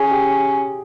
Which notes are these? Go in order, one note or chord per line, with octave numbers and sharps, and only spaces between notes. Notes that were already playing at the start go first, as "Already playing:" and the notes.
Already playing: C#4 G#4
G4